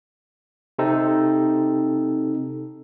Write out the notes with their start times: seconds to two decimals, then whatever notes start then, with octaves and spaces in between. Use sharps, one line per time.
0.79 C3 C4 D#4 A4